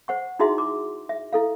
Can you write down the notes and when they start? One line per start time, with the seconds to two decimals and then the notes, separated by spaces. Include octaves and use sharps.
0.08 C5 F#5 C#6
0.39 D#4 E4 F#4 G#4 E5 C6
0.58 D6
1.09 E5
1.33 E4 A4 F5